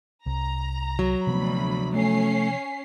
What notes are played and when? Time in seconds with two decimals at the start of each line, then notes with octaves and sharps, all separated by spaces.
0.26 C2 A#5
0.99 F#3
1.27 D2 C3 F3 B3 B5
1.92 A3 C#4 C7